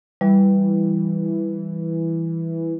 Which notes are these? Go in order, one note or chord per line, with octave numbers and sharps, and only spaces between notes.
E3 G3